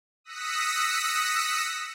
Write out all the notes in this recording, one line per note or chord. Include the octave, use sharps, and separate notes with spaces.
D#6 E6 F#6 A#6 B6 C#7